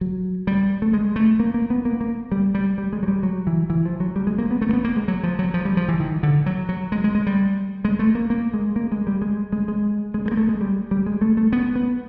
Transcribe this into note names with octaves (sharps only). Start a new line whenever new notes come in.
F#3
G3
A3
G#3
A3
A#3
A#3
B3
A#3
A#3
G3
G3
G3
G#3
F#3
G3
F#3
E3
E3
F3
F#3
G3
G#3
A#3
B3
A3
A#3
B3
A#3
G#3
F#3
F3
F#3
F3
G3
F3
E3
D#3
D3
F#3
F#3
G#3
G#3
G#3
G3
G#3
A3
A#3
A#3
G#3
A#3
G#3
G3
G#3
G#3
G#3
G#3
G#3
A#3
A3
G#3
G3
G3
G#3
A3
A3
B3
B3